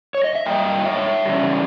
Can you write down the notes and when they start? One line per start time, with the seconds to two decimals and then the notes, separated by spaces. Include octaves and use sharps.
0.14 C#5
0.24 D#5
0.35 E5
0.46 G2 G3 A#3 D#5 G5
0.85 C#5 E5
1.25 C#3 E3 G3